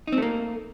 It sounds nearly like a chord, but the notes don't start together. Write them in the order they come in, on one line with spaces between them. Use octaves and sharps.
D#4 C4 A3 A#3